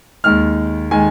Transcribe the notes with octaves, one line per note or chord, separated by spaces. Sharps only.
D#2 D#3 G#3 F6
D#3 G#3 G#5